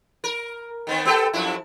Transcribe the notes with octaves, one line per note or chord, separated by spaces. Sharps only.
A#4
D#3 B3 C4
B3 G4 A4
F#2 F3 E4